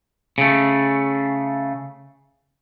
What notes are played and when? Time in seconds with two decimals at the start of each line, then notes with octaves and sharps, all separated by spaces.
0.38 C#3 A3